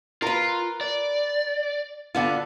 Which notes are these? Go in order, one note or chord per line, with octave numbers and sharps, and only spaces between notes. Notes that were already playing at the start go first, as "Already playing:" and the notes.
F4 A#4 B4
D5
D3 B3 F4